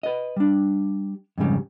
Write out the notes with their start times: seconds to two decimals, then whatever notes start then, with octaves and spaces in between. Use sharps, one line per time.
0.03 B4 D#5
0.36 G3 D4
1.38 F2 G#2 C#3 G3